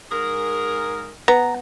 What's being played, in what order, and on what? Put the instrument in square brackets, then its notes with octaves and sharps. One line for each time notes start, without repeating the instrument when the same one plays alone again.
[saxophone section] G#2 G#4 A#4
[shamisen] B3 [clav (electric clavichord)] A#5